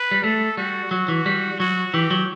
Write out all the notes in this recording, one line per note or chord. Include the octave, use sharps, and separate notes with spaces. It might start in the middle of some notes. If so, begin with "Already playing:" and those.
Already playing: B4
G3
A3 A4
G3 F#4
F#3 F#4
E3
G3
F#3 F#4
E3 G4
F#3